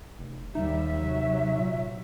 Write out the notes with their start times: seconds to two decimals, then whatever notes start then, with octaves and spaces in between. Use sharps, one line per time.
0.19 F1
0.55 D#2 G3 D#4 E5
0.97 C3 F#3
1.58 A#2